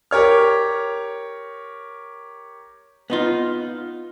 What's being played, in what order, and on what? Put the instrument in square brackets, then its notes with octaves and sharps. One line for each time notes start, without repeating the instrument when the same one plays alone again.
[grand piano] G4 A#4 C#5 F6
[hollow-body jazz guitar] B3 D#4 F4